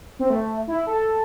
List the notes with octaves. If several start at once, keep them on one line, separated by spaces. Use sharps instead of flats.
C4
A3
E4
A4